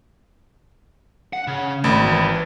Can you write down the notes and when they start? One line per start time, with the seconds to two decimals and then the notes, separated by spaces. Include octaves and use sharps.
1.33 F#5
1.47 C#3
1.84 G#1 A3 B5
2.06 E3